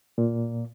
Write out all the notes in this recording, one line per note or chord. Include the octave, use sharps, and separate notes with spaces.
A#2